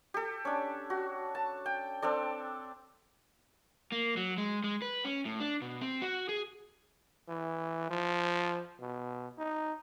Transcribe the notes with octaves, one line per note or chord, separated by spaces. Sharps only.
G4 A4
C#4 D4
F#4
A5
G5
C4 D4 A4 D5
A#3
F#3
G#3
G#3
B4
C#4
A2
D4
B2
C4
F#4
G#4
E3
F3
B2
D#4